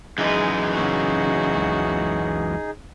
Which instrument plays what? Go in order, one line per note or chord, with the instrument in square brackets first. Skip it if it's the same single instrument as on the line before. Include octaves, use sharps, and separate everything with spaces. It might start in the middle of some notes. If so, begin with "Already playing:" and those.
[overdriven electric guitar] F#2 E3 [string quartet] G#3 [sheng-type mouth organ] D#4 G#4
[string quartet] C#3 F#4
[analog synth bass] C#2